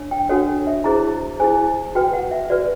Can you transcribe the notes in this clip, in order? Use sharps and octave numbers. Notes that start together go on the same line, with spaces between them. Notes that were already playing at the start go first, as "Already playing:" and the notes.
Already playing: D4 C#5
G5
D4 F#4 A4 C#5 F#5
E5
E4 G#4 C5 A#5
E4 G#4 C5 G#5
F#4 B4 G5
F#5
E5
F#4 B4 D5